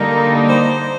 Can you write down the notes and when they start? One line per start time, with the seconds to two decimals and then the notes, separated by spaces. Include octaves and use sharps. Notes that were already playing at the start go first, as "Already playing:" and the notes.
Already playing: D3 G3 A#3 D#4 A#4
0.49 C5